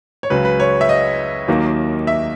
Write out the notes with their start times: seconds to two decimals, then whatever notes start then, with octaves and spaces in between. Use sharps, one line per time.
0.23 C#5
0.30 C#2 C#3 F#3 B4
0.45 B4
0.60 C#5
0.81 E5
0.89 D#5
1.48 D#2 D#3 F#3 A#3
2.07 E5